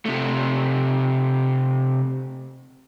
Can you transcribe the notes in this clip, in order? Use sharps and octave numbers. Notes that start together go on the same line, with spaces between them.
C3 A3